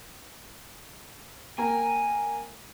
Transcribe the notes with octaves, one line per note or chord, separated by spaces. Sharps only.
A#3 G5 G#5 A#5